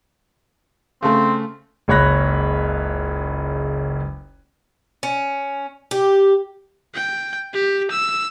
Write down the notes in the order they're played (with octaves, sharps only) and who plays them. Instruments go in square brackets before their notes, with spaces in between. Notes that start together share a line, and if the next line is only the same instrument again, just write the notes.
[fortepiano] C#3 A3 [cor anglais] C4
[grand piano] F#1 C#2 C#5 B5 F#6 A#6
[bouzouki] C#4
G4
[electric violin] G5
G4
E6